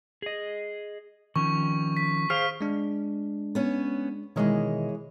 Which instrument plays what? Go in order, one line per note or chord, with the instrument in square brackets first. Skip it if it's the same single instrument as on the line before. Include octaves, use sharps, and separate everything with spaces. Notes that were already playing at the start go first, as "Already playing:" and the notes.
[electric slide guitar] G#4 D#5
[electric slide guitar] D#3 F3 C#4 [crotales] C#6
[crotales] B6
[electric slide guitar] G#4 C5 F5 [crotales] F6
[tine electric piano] G#3 D4
[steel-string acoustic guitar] B3 C#4 C#5
[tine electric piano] B2 D#3 D#5 [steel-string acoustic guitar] E3 G#3 C#5